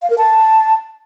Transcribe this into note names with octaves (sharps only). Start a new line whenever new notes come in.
F5
A#4
A5